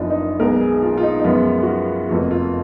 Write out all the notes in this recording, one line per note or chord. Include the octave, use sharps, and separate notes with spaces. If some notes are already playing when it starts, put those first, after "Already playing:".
Already playing: F#1 F#2 F3 B3 D4 D#4 F4
D#4
B1 B2 G#3 B3 A#4
G#4
F4
F4
D#4
D#4
F#2 F3 G#3 B3 F4
F#4
F4
F1 F2 F3 A#3 F#4
F4